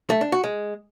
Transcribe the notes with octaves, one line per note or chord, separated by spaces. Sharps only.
A3
D4
F#4
G#3